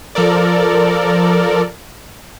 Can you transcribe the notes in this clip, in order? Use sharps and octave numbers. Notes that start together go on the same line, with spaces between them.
F3 A4 A#4 D5